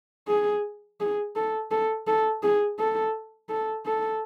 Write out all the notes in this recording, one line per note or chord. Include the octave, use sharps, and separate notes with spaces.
G#4
G#4
A4
A4
A4
G#4
A4
A4
A4